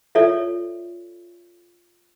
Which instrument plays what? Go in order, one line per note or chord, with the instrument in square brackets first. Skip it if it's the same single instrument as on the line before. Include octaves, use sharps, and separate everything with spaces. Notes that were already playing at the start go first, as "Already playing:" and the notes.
[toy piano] F4 A4 C#5 D5 E5